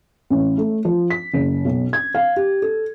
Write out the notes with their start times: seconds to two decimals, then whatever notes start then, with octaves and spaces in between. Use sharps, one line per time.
0.30 A1
0.58 A3
0.85 F3
1.10 B6
1.33 F#1
1.65 B1
1.93 G#6
2.15 F5
2.36 G4
2.62 A4